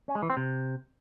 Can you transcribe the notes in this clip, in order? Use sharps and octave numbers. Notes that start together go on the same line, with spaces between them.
C#4
G#3
E3
C4
C3